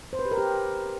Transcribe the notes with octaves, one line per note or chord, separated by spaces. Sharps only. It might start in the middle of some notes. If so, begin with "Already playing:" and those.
C5
B4
G4
A#4
G4